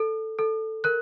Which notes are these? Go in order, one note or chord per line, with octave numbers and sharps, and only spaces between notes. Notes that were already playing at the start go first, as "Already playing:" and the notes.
Already playing: A4
A4
A#4 F#6